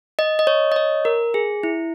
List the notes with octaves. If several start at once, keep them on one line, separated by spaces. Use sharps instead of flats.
D#5
D#5
C#5
D#5
C#5
A#4
G#4
E4